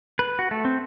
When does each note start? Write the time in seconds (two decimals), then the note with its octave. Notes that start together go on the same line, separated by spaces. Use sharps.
0.19 B4
0.39 F#4
0.51 A3
0.65 C4